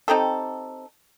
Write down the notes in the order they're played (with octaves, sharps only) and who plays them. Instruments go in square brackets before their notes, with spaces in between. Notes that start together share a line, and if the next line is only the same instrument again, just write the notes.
[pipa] C4 D#4 G4 A4